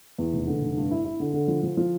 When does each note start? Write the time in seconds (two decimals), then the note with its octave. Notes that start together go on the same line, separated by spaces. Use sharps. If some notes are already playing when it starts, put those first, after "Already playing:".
0.18 E2
0.33 F1
0.47 D3
0.61 F1
0.77 G2
0.91 E4
1.05 E4
1.20 D3
1.34 D3
1.48 F3
1.63 F3
1.77 F3